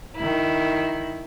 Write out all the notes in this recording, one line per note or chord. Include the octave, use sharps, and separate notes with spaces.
D#3 E4